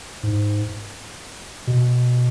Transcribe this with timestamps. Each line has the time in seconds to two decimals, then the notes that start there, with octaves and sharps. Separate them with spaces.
0.23 G#2
1.67 B2